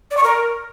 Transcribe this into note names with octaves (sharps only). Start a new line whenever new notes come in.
D5
C#6
A#4